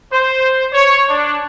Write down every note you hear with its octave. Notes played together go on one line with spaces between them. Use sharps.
C5
C#5
D4